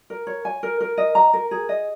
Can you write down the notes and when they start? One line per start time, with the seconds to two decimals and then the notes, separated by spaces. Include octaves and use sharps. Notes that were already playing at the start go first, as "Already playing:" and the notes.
0.10 A#4
0.27 C#5
0.45 G#5
0.63 A#4
0.80 A#4
0.98 D#5
1.15 A#5
1.33 A#4
1.51 G#4
1.69 D#5